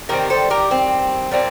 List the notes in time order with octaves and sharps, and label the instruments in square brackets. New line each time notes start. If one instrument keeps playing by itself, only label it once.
[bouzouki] D#3 G3 C4 G4 A#4
A4 C5
G4 A#4
C4
A#2 G3 C4